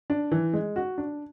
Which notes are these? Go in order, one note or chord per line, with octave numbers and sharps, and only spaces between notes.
D4
E3
G#3
F#4
D4